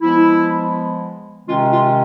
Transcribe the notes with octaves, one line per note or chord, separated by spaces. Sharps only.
F3 G#3 B3 E4
C3 D#3 G#3 C#4 F4
F4